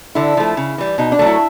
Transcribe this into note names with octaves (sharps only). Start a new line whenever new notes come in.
D3 E4
F3 A3
C#3
E3 G3
B2 D#4
D4
F#3 A3
E4